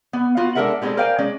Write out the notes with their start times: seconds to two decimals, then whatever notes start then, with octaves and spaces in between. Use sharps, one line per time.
0.13 B3
0.37 B3 F4 F#4
0.55 G#3 D4 A4 A#4 E5 F#5
0.82 G3 G#3 B3 C4 G#4 A4
0.97 A#4 C5 D5 F5 G5 G#5
1.18 G#3 C#4 D5